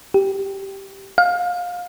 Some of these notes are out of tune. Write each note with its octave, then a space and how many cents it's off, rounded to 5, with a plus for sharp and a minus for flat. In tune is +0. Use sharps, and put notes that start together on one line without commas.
G4 -5
F5 +25